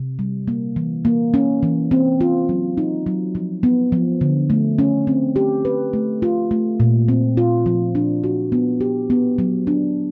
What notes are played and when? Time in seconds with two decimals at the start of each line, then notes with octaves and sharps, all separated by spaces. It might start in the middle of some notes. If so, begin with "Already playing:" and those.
Already playing: C3
0.19 G3
0.48 A#3
0.76 E3
1.05 A#3
1.34 C#4
1.63 E3
1.91 C4
2.21 F4
2.49 F#3
2.77 D#4
3.06 F#3
3.35 F3
3.63 B3
3.92 F3
4.21 D3
4.50 A3
4.79 C#4
5.07 C4
5.36 G4
5.65 B4
5.93 A3
6.22 F4
6.51 A3
6.80 A#2
7.08 C4
7.37 F4
7.66 F3
7.95 D4
8.24 F#4
8.52 B3
8.81 G4
9.10 B3
9.38 F#3
9.67 D4